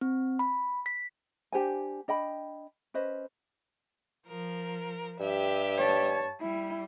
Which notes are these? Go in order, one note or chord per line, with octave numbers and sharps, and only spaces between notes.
C4
B5
B6
D4 G4 C5 G#5
D4 D#5 G5 B5
C#4 B4 C5 D#5
F3 A#4
G2 G4 E5
C#5 A5
G3 E4